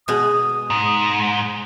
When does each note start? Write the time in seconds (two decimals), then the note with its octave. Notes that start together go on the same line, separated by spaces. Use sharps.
0.08 B2 G#3 D#6
0.70 G#2